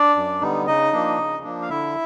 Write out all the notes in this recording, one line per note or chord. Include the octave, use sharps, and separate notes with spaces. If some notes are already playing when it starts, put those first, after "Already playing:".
Already playing: D4 D5
F#2
D3 G3 B3 D#4
C#3 D#4 D#5
F3 A#3 D4
C#3
F3 A#3 D4
F5
D3 E4 E5